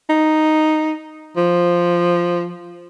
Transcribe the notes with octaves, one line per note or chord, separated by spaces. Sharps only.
D#4
F3